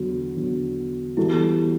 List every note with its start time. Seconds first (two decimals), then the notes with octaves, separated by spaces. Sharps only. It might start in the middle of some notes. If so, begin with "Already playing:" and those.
Already playing: E2 D3 F#3 F#4
0.36 E2 D3 F#3
1.17 E3 G3 B3 E4 F#4 A4